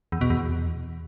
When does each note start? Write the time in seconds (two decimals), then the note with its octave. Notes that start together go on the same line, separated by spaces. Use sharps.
0.12 E2
0.21 B2
0.30 E2